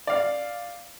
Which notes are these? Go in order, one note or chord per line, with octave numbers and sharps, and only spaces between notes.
D5 F5